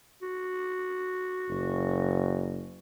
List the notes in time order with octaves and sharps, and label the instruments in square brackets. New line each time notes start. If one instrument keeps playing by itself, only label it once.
[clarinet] F#4
[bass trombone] F#1